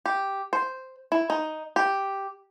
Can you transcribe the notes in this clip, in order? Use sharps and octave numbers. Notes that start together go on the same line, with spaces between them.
G4
C5
E4
D#4
G4